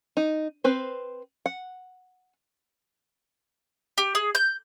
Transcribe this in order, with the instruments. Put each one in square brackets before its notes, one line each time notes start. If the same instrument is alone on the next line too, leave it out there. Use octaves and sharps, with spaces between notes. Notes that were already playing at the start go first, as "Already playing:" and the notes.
[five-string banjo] D#4
C4 B4 C5
F#5
[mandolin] G4
G#4
G6